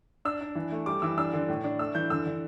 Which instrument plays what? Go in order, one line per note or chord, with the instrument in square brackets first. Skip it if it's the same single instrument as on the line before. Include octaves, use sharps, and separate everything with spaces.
[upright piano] D4 E6
D4
E3
A3
G3 D6
E3 E6
D4 E6
D3
A2
D4
A3 E6
E3 G6
D3 E6
D3